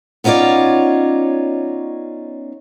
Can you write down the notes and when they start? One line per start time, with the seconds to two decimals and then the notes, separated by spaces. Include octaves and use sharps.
0.24 B3 C#4 D#4 F4 C#5 D5